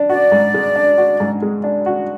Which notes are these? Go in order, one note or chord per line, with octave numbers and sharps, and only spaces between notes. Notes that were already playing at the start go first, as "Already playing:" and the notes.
Already playing: D4
F#4 D5
G#2
G#3
D4
F#4
G#2
G#3
D4
F#4